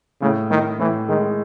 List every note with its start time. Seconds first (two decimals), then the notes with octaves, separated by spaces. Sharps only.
0.21 A2 C#3
0.51 A2 D#3
0.79 A2 E3
1.09 D#3 G#3